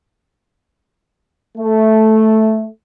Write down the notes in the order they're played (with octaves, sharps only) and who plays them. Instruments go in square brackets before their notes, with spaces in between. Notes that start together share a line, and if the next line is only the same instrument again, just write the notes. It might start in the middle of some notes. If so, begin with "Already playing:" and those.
[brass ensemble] A3